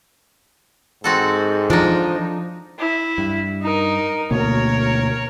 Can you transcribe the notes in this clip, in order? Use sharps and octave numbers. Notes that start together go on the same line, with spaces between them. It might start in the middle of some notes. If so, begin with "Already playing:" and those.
G#2 C4 F#4 A4
F3 D4 D#4
E4
G2
D#4 A#4
D2 B2 A#3 A#4 C#5